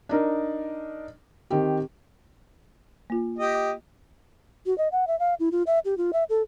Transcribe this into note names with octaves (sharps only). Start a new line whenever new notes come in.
D4 D#4 A#4
D#3 C4 G4
A#3 F4
G4 D#5
F#4
D#5
F#5
E5
F5
E4
F4
E5
G4
F4
E5
A4